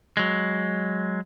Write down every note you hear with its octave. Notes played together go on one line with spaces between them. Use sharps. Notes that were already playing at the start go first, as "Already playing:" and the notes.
F#3 G#3